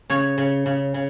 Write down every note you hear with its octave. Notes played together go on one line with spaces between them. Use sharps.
C#3 C#5
C#3
C#3
C#3